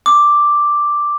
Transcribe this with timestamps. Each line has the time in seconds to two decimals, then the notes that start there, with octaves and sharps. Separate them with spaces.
0.06 D6